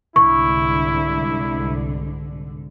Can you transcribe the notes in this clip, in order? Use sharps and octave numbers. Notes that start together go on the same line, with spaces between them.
C2 G#2 D3 E4 C#6